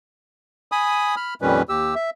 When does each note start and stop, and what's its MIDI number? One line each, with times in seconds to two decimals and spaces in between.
0.72 1.15 80
0.72 1.15 83
0.72 1.15 87
1.16 1.34 83
1.16 1.34 89
1.42 1.62 41
1.42 1.62 46
1.42 1.62 51
1.42 1.62 55
1.42 1.62 61
1.42 1.62 71
1.69 1.95 39
1.69 1.95 67
1.69 1.95 88
1.95 2.10 76